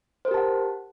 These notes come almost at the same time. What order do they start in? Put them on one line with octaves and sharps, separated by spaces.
C5 A#4 G4 A5 F#5